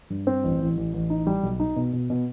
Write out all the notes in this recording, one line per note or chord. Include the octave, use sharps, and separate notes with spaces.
G2
C4
A1
A1
A1
A1
D#4
G3
B1
D#4
B2
B2
B2